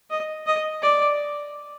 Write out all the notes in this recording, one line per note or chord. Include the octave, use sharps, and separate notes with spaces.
D#5
D#5
D5